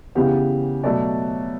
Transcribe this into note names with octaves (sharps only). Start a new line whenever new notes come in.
C#3 E3 B3 G4
B2 F#3 A3 D5